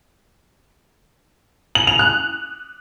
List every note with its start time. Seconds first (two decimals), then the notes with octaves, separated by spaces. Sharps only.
1.75 F#7
1.87 F7
1.99 F#6